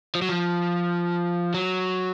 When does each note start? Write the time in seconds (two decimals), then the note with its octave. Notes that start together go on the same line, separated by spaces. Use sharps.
0.15 F3
0.22 F#3
0.29 F3
1.54 F#3